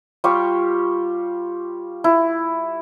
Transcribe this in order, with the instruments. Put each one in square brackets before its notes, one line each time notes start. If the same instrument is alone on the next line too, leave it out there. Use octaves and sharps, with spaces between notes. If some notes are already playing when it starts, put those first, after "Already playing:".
[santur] G3 F4 G4 C#5
E4